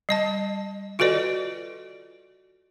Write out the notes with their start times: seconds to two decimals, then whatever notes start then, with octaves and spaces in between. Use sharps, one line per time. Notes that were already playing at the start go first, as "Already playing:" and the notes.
0.09 G3 D#5 A5
0.99 F4 F#4 A4 B4 D5 D#5